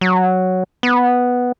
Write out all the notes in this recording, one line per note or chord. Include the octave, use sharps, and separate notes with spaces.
F#3
B3